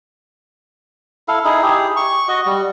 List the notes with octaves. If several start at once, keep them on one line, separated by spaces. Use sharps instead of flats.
E4 A4 F5
D#4 E4 G#4
G4 G#4
C#6
F#4 D#5
G3